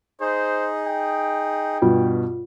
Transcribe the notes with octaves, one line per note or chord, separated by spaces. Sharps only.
D#4 G#4 C5
G5
G2 B2 F4